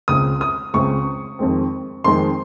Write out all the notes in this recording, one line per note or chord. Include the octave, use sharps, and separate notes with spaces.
C#2 C#3 G#3 C4 D#6
D#6
C#2 C#3 G#3 C4 C#6
F2 D#3 G#3 C4
F2 D#3 G#3 C4 C6